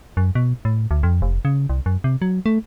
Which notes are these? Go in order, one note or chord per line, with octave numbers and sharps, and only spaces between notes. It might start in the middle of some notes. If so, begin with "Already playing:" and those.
F#2
B2
A2
D2
F2
F1
C#3
C2
F#2
C3
F#3
A3